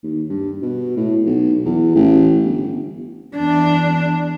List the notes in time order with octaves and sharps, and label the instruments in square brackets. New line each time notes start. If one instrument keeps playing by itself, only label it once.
[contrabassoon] D#2
G2
B2
A2
B1
E2
A1
G1
[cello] E2 D4